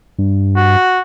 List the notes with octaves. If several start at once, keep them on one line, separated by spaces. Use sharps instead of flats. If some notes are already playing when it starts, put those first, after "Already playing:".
G2
F#4